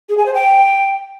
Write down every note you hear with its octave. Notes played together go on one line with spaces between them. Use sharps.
G#4
G#5
C5
G5